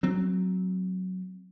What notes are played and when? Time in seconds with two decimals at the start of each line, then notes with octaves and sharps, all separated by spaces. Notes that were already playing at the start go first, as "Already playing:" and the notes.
0.03 F#3 C4